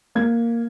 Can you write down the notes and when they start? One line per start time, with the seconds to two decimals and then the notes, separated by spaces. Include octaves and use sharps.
0.15 A#3 G#6